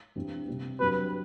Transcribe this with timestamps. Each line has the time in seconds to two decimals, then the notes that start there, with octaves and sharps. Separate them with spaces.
0.16 G2 E3 G3 C4
0.47 C3 G3 C4
0.79 G2 F#3 C4 G4 B4